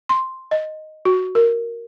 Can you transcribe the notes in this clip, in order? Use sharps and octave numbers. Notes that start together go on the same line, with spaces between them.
C6
D#5
F#4
A#4